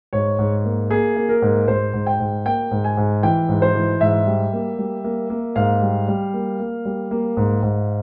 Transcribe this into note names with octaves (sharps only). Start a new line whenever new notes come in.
G#2 C#5
G#2
A#3
A#3 G#4
A#3
A#4
G#2
G#2 C5
G#2
G5
G#2
A#3 G5
G#2
G#5
G#2
E3 G5
G#2
C5
E3
G#2 E5
G3
A#3
G3
A#3
A#3
G#2 F5
G3
G3
A#3
A#3
G3
A#3
G#2
G#2